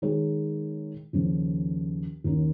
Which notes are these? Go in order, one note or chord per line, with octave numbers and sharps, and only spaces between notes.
D#3 G#3 D#4 G#4 C#5
D#2 C#3 F3
D#2 D#3 C#4